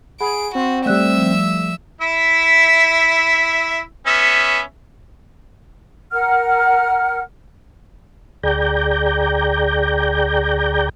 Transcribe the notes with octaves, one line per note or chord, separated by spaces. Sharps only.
G#4 F#5 B5 D7
C4 F#4
G3 A3 D5 E5 E6 F#6
F3
E4 E5
B3 C#4 E5
A#4 F#5 F6
D2 G#4 D5 G5 A#5 G6